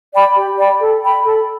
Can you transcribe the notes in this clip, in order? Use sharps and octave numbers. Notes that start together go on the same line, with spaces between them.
D5 G5 B5
G4
D5 G5 B5
A4
G5 B5
A4